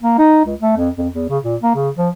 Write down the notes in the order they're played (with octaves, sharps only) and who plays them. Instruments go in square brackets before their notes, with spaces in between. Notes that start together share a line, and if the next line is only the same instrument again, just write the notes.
[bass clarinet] A#3
D#4
C#2
A3
F2
F2
E2
C#3
A#2
A#3
C#3
F3